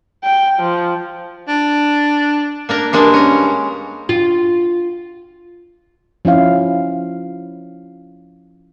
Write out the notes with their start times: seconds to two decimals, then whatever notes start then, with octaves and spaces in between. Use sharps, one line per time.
0.24 G5
0.60 F3
1.48 D4
2.69 A#3 D4 A#4
2.93 G2 G#3 A#3 D4
3.14 C#4 A#5
4.09 F4
6.25 F3 C#4 E4 F5